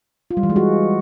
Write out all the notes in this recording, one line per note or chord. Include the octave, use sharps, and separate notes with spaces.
F4
G3
E3
G#3
F#4